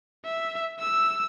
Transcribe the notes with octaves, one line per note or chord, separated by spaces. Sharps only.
E5
E6